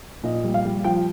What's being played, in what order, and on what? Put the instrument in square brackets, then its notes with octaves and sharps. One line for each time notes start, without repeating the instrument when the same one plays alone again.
[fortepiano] A#2 D#5
G3
F5
G3
F3 G5